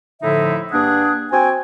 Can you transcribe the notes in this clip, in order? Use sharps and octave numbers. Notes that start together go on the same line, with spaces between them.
A2 D3 F3 D#4 E4 E5
G2 A#3 D4 G#4 F#5 D#6
C4 F#4 G5 G#5